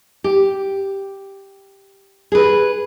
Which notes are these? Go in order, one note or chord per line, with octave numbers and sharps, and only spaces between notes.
G4
G#4 B4